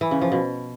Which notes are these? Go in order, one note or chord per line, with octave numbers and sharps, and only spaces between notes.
E3
C#3
F3
B2